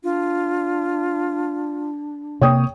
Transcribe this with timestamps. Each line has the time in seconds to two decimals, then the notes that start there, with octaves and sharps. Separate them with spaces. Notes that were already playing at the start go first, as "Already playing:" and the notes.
0.04 D4 F4
2.41 C3 A#3 C#5 G5 D#6